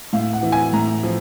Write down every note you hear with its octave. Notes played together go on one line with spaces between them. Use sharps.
A2 F5
F#5
E3
G#5
A2 A#5
F3